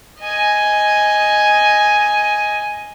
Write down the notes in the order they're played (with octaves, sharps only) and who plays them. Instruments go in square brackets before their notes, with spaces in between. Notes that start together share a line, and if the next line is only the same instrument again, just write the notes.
[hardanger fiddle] D#5 G#5